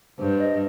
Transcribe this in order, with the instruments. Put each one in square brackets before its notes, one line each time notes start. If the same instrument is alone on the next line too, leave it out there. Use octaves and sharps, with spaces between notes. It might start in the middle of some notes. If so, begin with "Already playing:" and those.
[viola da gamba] G2 [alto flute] C5
[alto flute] D#5